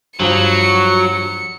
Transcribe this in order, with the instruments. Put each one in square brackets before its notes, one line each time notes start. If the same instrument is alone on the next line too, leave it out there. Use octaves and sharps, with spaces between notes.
[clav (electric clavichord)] G2 F3 [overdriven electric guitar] F#3 [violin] C#7